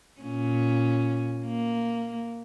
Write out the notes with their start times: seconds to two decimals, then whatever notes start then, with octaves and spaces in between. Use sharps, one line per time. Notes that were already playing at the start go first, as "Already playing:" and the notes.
0.21 A#2 C#4
1.46 A#3